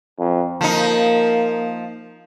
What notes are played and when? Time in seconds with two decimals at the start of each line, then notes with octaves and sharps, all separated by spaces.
0.19 F2
0.61 F3 A#3 D#4